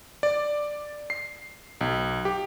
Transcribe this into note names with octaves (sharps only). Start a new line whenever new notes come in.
D5
C7
B1
G4